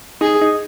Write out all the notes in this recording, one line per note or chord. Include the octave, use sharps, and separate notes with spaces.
D#4 G#4
D#4